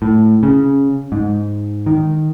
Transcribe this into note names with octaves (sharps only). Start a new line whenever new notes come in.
A2
C#3
G#2
D#3